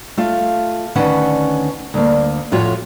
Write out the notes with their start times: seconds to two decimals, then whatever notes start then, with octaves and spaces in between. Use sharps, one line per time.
0.17 A3 F4 F5
0.95 D2 D#3 C#4 B4 F#5 A5
1.94 D2 A#3
2.52 F2 A2 F4 F#4 C#5